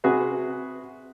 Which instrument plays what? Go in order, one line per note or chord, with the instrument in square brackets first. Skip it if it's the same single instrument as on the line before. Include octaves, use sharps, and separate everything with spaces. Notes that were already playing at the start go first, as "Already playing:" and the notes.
[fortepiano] C3 F#4 G#4 B4